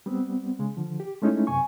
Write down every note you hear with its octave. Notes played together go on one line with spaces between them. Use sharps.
G3 B3 C4
C#3 G#3
D3 F3
G4
G#3 A3 C#4 D#4 E4
F#2 C3 G#5 C#6